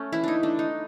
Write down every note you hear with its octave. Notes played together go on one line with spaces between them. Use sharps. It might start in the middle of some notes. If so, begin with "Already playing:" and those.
Already playing: A3 C#4
E3 E4
D4 D#4
A3 D4
D#4